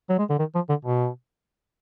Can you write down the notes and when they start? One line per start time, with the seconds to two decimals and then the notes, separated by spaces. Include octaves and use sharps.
0.10 F#3
0.19 G#3
0.30 D3
0.39 D#3
0.55 F3
0.70 D3
0.85 B2